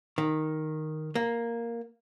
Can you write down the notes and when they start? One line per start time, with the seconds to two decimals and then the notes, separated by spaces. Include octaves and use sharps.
0.18 D#3
1.15 A#3